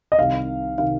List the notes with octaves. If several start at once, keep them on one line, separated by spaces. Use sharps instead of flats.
D#5
C2 C3 D#3 F5
C3 D#3 F5